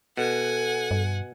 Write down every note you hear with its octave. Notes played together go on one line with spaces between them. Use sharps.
B2 A4 F#5 G#5
G2